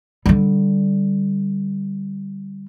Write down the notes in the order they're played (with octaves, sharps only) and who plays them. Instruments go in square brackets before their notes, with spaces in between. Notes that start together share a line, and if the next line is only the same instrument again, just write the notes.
[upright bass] D3 G3